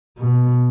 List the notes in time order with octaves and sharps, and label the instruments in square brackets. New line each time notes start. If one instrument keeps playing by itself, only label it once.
[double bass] B2